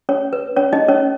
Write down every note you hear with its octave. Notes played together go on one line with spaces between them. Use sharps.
C#4 C#5
B4
C#4 C#5
D#4 D#5
C#4 C#5